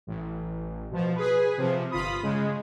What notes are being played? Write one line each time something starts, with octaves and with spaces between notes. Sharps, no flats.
A1
B2 F3
G#4 B4
C3 F3
G1 F4 B5 D#6
C#3 G#3